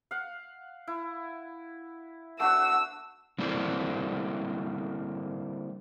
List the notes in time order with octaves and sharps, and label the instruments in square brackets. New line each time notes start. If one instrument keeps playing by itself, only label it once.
[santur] F5 F#5
E4
[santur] A3 D4 F#4 [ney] F#5 [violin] E6
[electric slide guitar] D3 G3 A#3 C4 D4 E4